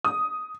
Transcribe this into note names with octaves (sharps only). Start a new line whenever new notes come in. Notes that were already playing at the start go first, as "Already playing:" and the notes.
D#6